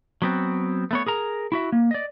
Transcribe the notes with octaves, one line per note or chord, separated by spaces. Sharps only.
F#3 B3 C4
A3 B3 C#5
G#4 A#4 A#5
E4 F#4 E5
A#3
D5 D#5